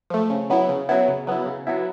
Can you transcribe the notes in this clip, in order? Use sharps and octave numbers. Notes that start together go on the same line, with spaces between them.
F3 A3
C#3
F#3 B3 E4
C#3
F#3 B3 E4
C#3
F#3 B3 E4
C#3
F#3 B3 E4